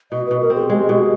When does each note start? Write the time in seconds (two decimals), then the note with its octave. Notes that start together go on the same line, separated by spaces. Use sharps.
0.11 B2 D#5
0.26 B2 B4
0.41 A#4
0.50 C4 G#4
0.69 G#3 G4
0.89 B2